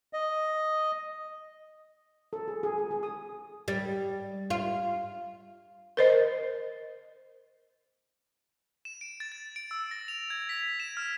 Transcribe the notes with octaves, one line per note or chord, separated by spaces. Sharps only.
D#5
A4
G#4
G#4
G#4
G#4
D#6
G3
F4
A#4 C5 D#5
E7
D7
A6
A6
D7
E6
A#6
F7
G#6
B6
E7
F6